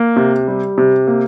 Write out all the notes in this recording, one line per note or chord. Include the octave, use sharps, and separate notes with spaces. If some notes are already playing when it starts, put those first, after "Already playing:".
Already playing: A#3
C3
G3
C3
A#3